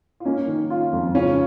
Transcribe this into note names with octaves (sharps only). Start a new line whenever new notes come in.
F4
A#3 C#4 D#4
D#3
F4
F2
C#3 C#4 F4